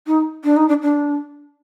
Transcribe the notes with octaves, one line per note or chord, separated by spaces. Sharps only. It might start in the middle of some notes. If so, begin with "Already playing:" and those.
D#4
D4
D#4
D4
D4